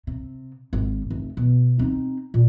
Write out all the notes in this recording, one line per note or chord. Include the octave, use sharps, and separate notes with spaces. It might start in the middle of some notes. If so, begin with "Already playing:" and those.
C3
G#1
F1
B2
C4 D#4
A#2